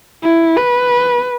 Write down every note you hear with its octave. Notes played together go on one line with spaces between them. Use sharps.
E4
B4